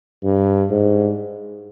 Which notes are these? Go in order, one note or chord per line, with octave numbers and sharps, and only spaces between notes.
G2
G#2